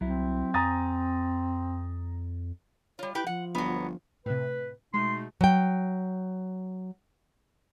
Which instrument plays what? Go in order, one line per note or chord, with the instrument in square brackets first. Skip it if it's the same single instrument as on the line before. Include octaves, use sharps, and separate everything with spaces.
[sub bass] C2 [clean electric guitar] F#3 E4 [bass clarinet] C4
[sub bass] F2 [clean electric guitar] G#5 [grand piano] A#5 D#6 A6
[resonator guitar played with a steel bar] G3 F4 [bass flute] C#5
[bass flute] E4 [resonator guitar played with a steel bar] G4 B4 G5
[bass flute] F3 [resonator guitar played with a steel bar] F#5
[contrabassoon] G1 [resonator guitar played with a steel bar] F#3 B3
[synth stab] A2 C3 [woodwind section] B4
[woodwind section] B2 A3 D#4 [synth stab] G#3 [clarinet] C6
[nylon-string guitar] F#3 G5